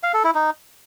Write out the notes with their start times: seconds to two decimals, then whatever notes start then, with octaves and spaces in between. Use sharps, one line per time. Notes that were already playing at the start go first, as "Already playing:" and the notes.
0.03 F5
0.14 A4
0.24 E4
0.35 D#4